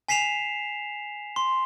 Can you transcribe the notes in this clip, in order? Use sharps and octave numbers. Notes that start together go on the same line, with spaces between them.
G#5 B6 C7 E7 F7
C6